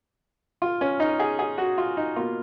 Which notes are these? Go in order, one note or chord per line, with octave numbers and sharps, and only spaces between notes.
F4
C#4
D#4
G#4
G#4
F#4
F4
D#4
B2 A#3 F4